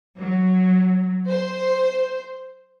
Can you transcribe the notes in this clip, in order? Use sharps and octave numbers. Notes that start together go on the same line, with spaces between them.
F#3
C5